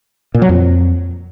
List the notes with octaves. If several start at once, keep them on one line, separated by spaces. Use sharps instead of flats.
A#2
F#3
F2